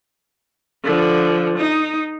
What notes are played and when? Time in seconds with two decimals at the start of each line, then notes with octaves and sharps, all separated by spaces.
0.84 D3 F3
1.58 D#4